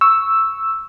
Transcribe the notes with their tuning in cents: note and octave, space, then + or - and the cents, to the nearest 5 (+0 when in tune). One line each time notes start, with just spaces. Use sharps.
C#6 +0 E6 +0